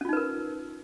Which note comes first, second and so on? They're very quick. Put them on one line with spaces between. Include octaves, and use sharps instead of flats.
C#4 F4 D#4 B4 A#4